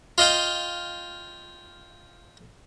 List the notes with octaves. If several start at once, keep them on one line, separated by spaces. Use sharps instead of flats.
F4 D#5 F5 G5